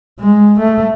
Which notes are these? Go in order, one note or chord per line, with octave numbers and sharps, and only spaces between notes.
G#3
A3